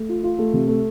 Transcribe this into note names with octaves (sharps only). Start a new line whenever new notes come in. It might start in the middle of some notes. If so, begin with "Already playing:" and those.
Already playing: A3
F4
F4
A3
C3
A3